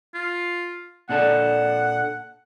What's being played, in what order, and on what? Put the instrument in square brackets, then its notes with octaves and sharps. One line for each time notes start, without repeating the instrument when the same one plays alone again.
[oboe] F4
[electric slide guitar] A#2 D4 A4 [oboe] F#5